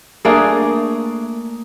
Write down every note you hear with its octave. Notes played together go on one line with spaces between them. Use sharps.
A3 A#3 D4 G#4